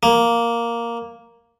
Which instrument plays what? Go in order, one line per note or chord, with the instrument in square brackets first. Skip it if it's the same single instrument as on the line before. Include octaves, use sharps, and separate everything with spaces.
[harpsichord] A#3